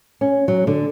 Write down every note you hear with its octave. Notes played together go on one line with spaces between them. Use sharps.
C#4
F#3
D3